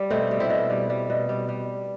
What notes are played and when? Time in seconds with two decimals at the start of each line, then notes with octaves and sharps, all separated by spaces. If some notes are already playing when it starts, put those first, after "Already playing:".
Already playing: G3
0.10 B2 A3 C4
0.31 G3
0.40 C4 E4
0.50 B2
0.70 G3
0.90 G3
1.10 B2
1.29 G3
1.49 G3